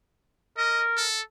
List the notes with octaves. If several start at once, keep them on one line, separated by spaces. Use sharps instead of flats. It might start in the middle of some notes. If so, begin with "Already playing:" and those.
A#4 D#5
A4